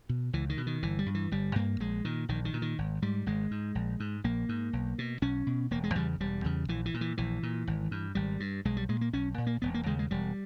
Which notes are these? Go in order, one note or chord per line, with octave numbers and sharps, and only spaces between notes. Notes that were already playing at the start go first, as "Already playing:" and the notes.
B2
C#2 E3
D#3
B2
D#3
G1 E3
G3
G2
E3
G1 G3
G2 A#3
A#1 G#3
A#2 D#3
A#1 D#3
D#3
A#2
D#3
G#1
G#2 G3
G#1 G#3
G#2
A#1
G#2
A#1 A#3
G#2
B1
B2
B1 C#4
B2
E1 A#3
G#3
E2 C#3 G3
E1 G3
E2 C#3
A#1 E3
E3
A#2
E3
A#1 E3
A#2
G#1
G2
G#1 G3
G2
B1 G#3
G3
A#2 G#3
A#3
B1 C#4
A#2
A#3
E1 B3
A#3
D#2 C#3 G#3
G#3
E1 G3